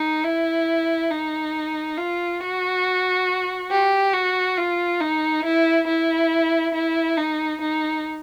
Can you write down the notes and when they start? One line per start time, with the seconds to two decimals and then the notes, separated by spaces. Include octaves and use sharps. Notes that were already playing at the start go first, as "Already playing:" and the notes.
Already playing: D#4
0.24 E4
1.10 D#4
1.97 F4
2.41 F#4
3.71 G4
4.14 F#4
4.57 F4
5.01 D#4
5.45 E4
5.87 E4
6.74 E4
7.17 D#4
7.61 D#4